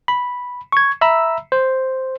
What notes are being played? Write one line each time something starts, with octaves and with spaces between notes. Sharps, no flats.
B5
C#6 G#6
E5 A#5 B5 E6
C5